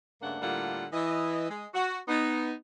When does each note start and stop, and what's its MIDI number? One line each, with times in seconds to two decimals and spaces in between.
0.21 0.37 43
0.21 0.37 49
0.21 0.37 57
0.21 0.37 58
0.21 0.37 62
0.21 0.37 78
0.42 0.85 45
0.42 0.85 50
0.42 0.85 55
0.42 0.85 58
0.42 0.85 65
0.42 0.85 78
0.92 1.46 52
0.92 1.46 75
1.49 1.65 56
1.74 1.99 66
2.08 2.53 59
2.08 2.53 63